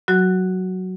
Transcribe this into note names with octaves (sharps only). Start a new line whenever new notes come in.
F#3 F#4